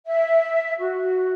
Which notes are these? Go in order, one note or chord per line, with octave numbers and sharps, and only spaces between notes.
E5
F#4